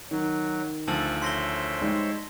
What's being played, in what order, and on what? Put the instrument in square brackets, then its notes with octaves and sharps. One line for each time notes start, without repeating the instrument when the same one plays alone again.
[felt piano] D#3 [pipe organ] F#3
[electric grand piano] D2 F3 [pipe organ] A4 [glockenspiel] A5 E6 F#7
[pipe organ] C5 C#5 E5 [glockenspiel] C6 A#6 G7
[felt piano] G3 G#3 D#4